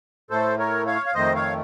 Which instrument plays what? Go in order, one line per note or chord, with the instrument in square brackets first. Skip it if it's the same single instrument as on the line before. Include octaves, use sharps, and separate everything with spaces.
[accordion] A2 A3 A4 C5
A#4 C#5
C#5 F5
F5
F2 D#3 A3 C5 D#5
C#5 F5